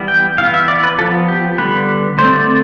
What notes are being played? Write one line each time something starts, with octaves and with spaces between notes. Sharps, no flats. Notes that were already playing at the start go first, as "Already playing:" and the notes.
Already playing: E3 G3 B3
G5
E3 B3 F5
E5
D5
B4
F3 B3 A4
G4
D3 G3 B3 B4
D3 A3 C4 C5
D5